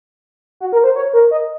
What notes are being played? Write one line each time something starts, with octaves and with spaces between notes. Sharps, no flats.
F#4
A#4
C5
C#5
A#4
D#5